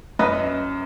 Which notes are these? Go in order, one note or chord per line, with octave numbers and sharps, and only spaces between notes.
F#2 B4 D#5